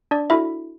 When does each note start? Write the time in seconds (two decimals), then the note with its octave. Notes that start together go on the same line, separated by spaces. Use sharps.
0.11 D4 D5
0.30 D4 E4 F#4 A4 E5